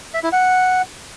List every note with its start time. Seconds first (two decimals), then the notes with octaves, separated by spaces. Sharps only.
0.14 E5
0.23 E4
0.32 F#5